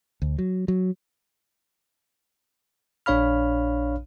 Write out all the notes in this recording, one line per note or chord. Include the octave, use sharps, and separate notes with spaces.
D2
F#3
F#3
A#1 D4 C#5 F5 B5 F6